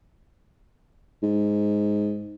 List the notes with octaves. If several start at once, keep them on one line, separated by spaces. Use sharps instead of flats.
G#2